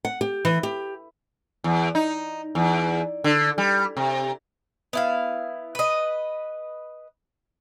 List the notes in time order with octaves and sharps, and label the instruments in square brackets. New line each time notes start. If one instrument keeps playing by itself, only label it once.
[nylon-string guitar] F#5
G4
E3
G4
[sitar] E2
D#4
E2
D3
G3
C3
[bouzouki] B3 E4 F5
B4 D#5